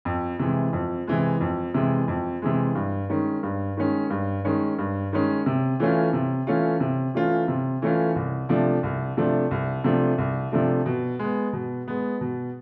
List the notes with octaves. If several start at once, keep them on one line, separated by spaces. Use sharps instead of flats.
F2
C3 E3 G#3
F2
C3 E3 G#3
F2
C3 E3 G#3
F2
C3 E3 G#3
G2
D#3 G#3 C#4
G2
D#3 G#3 C#4
G2
D#3 G#3 C#4
G2
D#3 G#3 C#4
C3
E3 A3 C#4 F4
C3
E3 A3 C#4 F4
C3
E3 A3 C#4 F4
C3
E3 A3 C#4 F4
C2
C3 F3 A3 D4
C2
C3 F3 A3 D4
C2
C3 F3 A3 D4
C2
C3 F3 A3 D4
B2
G#3 B3
B2
G#3 B3
B2